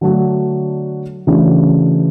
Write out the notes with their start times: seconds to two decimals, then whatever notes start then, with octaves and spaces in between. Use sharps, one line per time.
0.01 D3 F#3 A3 D4 F#4
1.27 C#3 E3 A3 D4 F#4